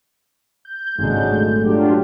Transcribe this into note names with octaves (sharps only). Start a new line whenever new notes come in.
G6
G#1 A#2 D3 F#3 G#3
A3
F#3 D4 F4 G4